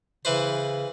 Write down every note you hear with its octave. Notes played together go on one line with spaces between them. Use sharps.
C#3 E3 B4 C5